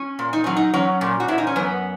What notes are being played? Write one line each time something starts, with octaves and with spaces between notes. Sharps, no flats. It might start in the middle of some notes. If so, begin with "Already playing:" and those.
Already playing: C#4
A#2
D#4
F#3 C#4
D#4
F#3 C#4
A#2
F#4
A#2 E4
D#4
C#4
F#2 B3